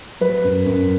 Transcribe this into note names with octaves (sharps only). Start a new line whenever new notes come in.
F#3 B4
F#2
F#2